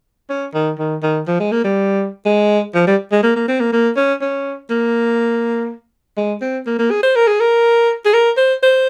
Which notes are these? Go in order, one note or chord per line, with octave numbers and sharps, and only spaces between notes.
C#4
D#3
D#3
D#3
F3
G#3
A#3
G3
G#3
F3
G3
G#3
A#3
A#3
C4
A#3
A#3
C#4
C#4
A#3
G#3
C4
A#3
A#3
G#4
C5
A#4
G#4
A#4
G#4
A#4
C5
C5